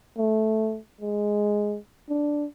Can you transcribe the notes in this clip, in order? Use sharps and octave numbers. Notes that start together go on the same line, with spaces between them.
A3
G#3
D4